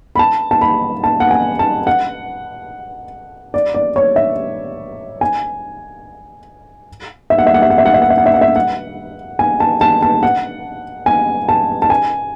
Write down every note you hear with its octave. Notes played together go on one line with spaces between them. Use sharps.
B5
A5
A5
B5
A5
F#5
G#5
A5
F#5
D5
D5
C#5
E5
G#5
E5
F#5
E5
F#5
E5
F#5
E5
F#5
E5
F#5
E5
F#5
E5
F#5
E5
F#5
G#5
A5
A5
A5
F#5
G#5
A5
A5
G#5